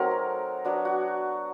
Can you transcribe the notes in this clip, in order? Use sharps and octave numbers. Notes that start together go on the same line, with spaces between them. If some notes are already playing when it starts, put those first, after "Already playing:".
Already playing: F#3 A3 C4 D#4 A#4
F#3 B3 D4
F#4